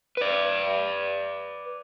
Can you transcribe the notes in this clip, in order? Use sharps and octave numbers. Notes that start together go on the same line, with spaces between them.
B4 D5